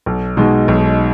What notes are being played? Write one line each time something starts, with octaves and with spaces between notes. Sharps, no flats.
B1
B2 G#3 D#4
B1